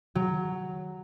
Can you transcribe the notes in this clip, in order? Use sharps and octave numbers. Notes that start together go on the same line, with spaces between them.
F#3